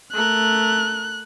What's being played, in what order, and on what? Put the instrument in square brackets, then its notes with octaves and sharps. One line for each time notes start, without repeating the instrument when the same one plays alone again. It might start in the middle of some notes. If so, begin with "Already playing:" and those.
[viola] A3 A#4 [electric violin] F#6